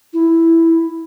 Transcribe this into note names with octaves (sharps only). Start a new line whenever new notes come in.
E4